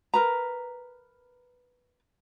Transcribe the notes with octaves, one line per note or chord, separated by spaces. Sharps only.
A#4 B4 A#5